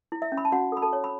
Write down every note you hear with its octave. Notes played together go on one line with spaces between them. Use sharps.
E4
E5
C#4
B5
A5
C#4 F#4 F#5
A4
B5
A4 A5
C#5
B5